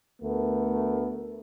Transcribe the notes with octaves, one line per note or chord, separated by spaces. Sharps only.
D2 A3 B3 A#4